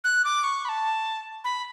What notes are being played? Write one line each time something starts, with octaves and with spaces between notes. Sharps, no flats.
F#6
D6
C#6
B5
A5
B5